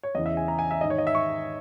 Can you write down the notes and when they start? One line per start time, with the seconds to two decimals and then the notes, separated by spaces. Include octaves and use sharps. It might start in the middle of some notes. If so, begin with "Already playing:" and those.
0.03 C#5
0.15 E2 C#3 E3 D#5
0.26 E5
0.37 G#5
0.48 A#5
0.59 G#5
0.71 E5
0.81 G#2 D#3 D#5
0.90 C#5
0.98 D#5
1.07 E5
1.15 C#6